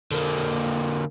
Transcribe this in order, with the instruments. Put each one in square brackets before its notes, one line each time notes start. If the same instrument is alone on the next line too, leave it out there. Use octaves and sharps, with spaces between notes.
[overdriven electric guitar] D3 A#3